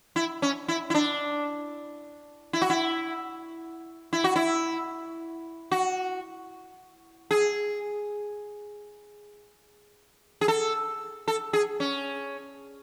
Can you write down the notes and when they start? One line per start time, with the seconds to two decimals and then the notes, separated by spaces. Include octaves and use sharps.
0.16 E4
0.42 C#4
0.68 E4
0.90 E4
0.94 D4
2.53 E4
2.62 F#4
2.70 E4
4.13 E4
4.24 F#4
4.36 E4
5.71 F#4
7.31 G#4
10.41 G#4
10.48 A4
11.28 A4
11.53 G#4
11.80 C#4